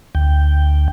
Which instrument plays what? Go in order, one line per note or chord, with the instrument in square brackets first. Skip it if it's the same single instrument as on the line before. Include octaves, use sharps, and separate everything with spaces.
[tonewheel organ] D2 G5